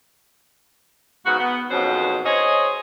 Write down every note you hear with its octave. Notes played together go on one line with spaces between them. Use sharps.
G#2 C#3 B3 F#4
B3
F2 G#2 B2 F#3 C#4 C5
G#4 C5 C#5 D#5